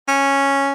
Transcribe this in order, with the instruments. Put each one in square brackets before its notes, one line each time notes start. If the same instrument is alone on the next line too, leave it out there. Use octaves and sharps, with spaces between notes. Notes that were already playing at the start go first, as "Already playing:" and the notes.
[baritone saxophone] C#4